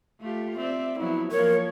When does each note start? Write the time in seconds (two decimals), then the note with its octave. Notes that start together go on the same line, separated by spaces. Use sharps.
0.20 A3 F4 G4
0.58 C4 D5 E5
0.99 F3 F#3 B3 E4
1.31 F3 A#3 A#4 C#5